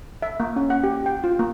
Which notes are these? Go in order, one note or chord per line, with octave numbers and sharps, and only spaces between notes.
E5
A#3
C#4
F#5
G4
G5
F4
A#3